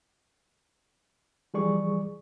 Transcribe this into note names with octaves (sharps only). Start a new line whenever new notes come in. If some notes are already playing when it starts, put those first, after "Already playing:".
E3 F3 G3 G#4 D5 C#6